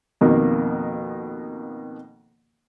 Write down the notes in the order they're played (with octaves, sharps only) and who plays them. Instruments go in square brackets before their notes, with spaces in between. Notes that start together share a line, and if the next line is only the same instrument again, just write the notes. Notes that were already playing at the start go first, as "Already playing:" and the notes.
[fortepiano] F2 B2 D#3 A#3